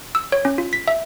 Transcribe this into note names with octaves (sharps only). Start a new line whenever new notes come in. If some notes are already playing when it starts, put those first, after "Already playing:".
E6
C#5
C#4
F4
B6
E5